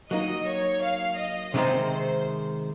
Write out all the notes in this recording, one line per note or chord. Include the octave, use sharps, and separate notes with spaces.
F#3 A#3 D#4 D#5
C#5
F5
D#5
C3 D#3 G#3 C4 D#4 C5
C5